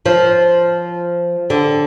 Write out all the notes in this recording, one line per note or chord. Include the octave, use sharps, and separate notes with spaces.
F3
D3